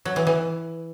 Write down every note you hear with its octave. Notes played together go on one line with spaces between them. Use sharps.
F#3
E3
E3